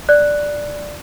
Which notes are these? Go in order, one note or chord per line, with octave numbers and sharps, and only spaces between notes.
D5 F#6